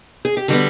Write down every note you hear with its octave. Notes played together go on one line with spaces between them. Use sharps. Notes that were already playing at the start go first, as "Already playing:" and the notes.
G#4
G4
D3 G3 B3 F#4